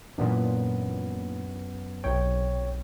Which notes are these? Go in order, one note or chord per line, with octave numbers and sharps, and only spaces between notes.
F#2 A#2 E3 B3 D4
B1 C3 C#5 G5